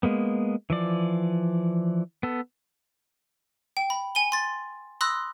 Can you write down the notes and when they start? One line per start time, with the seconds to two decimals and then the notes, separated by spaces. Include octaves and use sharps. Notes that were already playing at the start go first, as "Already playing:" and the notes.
0.03 G#3 A#3 B3
0.70 E3 F3 D5
2.23 B3 A4
3.77 G5
3.90 B5
4.15 G#5 D#7 G7
4.32 C6 A6
5.01 B5 C6 D#6 E6 F#6 A#6